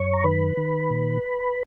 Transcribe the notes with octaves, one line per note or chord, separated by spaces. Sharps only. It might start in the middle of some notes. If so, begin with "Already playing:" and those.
Already playing: F#2 C#5 C#6
A#5
D#3 B4 B5
D#3
A#2